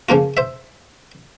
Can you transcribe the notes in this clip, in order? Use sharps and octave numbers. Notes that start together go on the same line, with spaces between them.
C#3 F3 A#3 F4
C5 E5